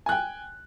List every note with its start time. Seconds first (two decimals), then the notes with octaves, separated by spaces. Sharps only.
0.06 G#5
0.09 F#6
0.12 G5